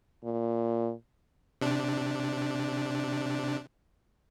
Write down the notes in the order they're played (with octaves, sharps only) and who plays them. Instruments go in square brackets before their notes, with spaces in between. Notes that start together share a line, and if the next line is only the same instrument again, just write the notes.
[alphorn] A#2
[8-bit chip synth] C3 D4